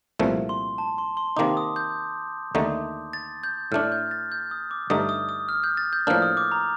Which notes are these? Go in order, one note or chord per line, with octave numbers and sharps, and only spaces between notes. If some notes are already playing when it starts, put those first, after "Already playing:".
C2 A#2 F3 A3
C6
A5
C6
C6
C3 D#3 A#3 D#4 D6
D#6
G6
D#2 D3 A3 D#4
A6
G6
A2 A3 D4 F6
G6
A6
G6
D#6
D6
G2 D3 A3 D#4 D#6
D#6
D#6
F6
G6
A6
G6
A2 F3 A#3 D4 F6
D#6
D6
A#5